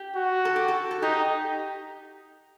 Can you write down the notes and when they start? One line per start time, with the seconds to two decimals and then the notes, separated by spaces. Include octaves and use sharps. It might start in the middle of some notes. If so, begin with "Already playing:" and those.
Already playing: G4
0.16 F#4
0.45 A4
0.56 G4
0.68 A4
0.91 A4
1.02 D#4 G4